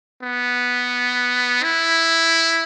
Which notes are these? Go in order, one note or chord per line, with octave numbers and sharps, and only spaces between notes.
B3
E4